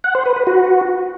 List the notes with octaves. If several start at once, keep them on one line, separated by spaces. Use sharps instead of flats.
F#5
C5
B4
B4
F#4